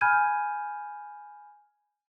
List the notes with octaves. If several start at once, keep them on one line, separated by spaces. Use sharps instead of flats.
G#5 B5 F6 G6 G#6 D#7